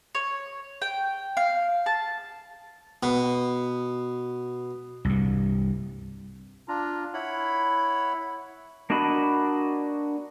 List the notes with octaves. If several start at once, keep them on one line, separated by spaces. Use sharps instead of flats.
C#5
G5
F5
A5
B2
C2 G2
D4 F4 A#5
E4 C#5 F#5 B5
A#3 D4 F#4 D#5 B5